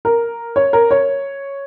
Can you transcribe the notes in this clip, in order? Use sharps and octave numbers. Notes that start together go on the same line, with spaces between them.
A#4
C#5
A#4
C#5